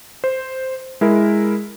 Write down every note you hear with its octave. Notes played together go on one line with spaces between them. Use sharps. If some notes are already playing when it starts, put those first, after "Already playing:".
C5
G#3 E4 A#4